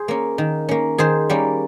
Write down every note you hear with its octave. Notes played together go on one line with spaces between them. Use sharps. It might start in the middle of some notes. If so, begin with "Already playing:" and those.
Already playing: G#4 C5
A#3 C#4
D#3
A#3 C#4
D#3 G#4 C5
G3 A#3 C#4